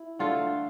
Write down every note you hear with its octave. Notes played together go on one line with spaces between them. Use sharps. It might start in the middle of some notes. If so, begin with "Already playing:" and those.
Already playing: E4
D3 A3 F4 A4